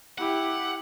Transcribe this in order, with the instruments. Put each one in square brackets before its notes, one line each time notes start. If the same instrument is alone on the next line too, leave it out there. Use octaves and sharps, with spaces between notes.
[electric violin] E4 G4 [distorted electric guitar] F#5